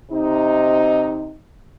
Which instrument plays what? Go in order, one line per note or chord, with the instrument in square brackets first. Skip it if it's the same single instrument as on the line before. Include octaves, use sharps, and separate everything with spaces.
[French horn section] C3 D#4